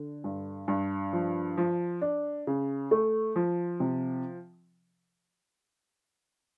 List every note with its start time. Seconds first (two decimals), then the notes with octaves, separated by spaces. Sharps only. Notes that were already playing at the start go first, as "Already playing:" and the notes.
Already playing: D3
0.24 G2
0.68 G2
1.13 F3
1.57 F3
2.02 D4
2.47 C#3
2.91 A3
3.36 F3
3.80 C3